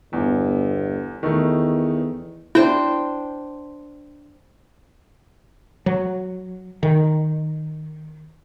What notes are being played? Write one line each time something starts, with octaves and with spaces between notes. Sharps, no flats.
G1 E2
E2 D#3 A3 D#4
D4 E4 C5 G5
F#3
D#3